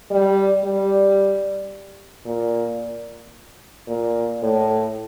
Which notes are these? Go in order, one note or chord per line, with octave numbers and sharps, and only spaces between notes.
G3
G3
A#2
A#2
A2